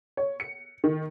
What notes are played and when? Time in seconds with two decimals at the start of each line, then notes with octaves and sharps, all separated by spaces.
0.17 C#5
0.40 C#7
0.84 D#3